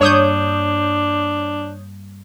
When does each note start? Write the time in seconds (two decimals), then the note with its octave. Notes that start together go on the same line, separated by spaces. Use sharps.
0.01 G2 A#3 D4 C#5 D#6 G6